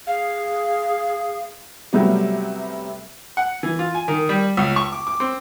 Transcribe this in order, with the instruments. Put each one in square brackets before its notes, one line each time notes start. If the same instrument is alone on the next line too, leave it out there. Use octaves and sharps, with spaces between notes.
[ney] G#4 [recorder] F5
[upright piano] C3 F#3 G3 A3 B3
[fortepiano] F#5
E3
F4
G#5
D#3
G3
C#2
C#6
D6
D6
C4